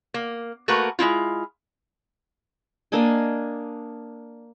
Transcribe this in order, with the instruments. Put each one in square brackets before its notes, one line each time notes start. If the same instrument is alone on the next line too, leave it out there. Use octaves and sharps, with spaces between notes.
[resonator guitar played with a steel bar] A#3
A3 A#3 F#4 A#4 B4
G#3 C4 E4 F4
[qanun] A#3 D4 D#5 G#5